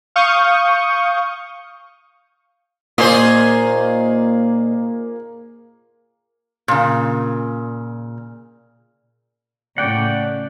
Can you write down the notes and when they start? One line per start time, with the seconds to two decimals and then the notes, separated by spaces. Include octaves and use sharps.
0.16 F5 C#6 D#6 G6
2.98 A#2 D#3 A#3 F4 G#4 C5 D#5
6.68 A#2 C#3
9.78 A2 C#3 D5 F#5 G5